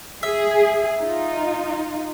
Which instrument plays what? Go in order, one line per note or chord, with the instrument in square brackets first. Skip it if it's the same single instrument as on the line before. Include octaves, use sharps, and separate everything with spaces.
[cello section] G#4 [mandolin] E5
[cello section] D#4 F4